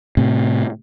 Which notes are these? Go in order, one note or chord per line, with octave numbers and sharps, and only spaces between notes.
A2 C3